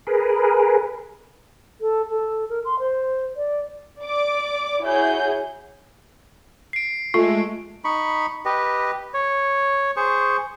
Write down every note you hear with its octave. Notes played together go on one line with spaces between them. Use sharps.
G#4 A#4 B4
A4
A4
A#4
C6
C5
D5
D5 D6
E4 F#4 G#4 C#5 G6
C7 D7
G#3 A3 F4
D#4 B5 C#6
G4 B4 D#5
C#5
G#4 C5 C#6